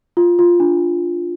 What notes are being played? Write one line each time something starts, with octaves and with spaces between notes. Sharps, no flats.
F4
F4
D4